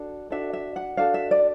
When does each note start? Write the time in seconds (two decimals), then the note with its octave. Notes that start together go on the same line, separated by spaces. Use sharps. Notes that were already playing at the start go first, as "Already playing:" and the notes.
Already playing: D4 F#4 A4
0.30 D4 F#4 A4 E5
0.53 E5
0.76 F#5
0.97 D4 F#4 A4 F5
1.14 E5
1.31 D5